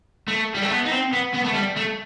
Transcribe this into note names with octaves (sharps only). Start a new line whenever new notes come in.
A3
G3
A3
B3
D#4
C4
B3
B3
A3
G3
A3